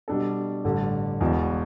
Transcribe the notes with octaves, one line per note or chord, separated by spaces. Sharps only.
B2 G3 D4 A4
A1 G2 D3
E1 E2 B2